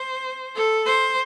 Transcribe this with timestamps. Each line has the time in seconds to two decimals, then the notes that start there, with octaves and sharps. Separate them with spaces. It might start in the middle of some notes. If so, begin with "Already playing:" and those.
Already playing: C5
0.56 A4
0.86 C5